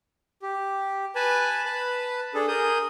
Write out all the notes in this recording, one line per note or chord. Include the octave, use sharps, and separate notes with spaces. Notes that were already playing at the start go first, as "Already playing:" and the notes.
G4
B4 G#5 A5 B5
B4 A5 B5
D4 G#4 A4
G#4 A#4 D#6 G6